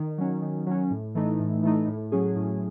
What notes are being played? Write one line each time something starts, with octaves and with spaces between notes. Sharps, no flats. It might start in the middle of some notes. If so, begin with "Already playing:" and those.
Already playing: D#3
F#3 C#4
D#3
F#3 C#4
A2
E3 A3 D#4
A2
E3 A3 D#4
A2
F#3 C#4 G#4
A2